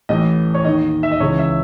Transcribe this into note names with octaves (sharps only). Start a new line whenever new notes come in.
A1 A2 E3 D#5
C#5
D#2 D#3 D#5
E5
D#5
C#2 C#3 E3 C#5
E5